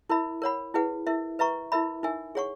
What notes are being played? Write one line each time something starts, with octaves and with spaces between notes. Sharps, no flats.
E4 A#4 E5 B5
A#4 C#5 F#5 B5
E4 G#4 B4 F#5
E4 A#4 E5
B4 E5 A#5 C#6
E4 A#4 E5 B5
D#4 A#4 E5 G#5
G#4 C#5 F#5 C#6